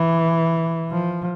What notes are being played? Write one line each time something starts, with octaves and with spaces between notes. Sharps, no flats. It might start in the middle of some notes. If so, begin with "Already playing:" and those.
Already playing: E3
F3